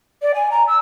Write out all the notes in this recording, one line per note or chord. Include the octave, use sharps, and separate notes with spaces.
D5
G#5
A#5
E6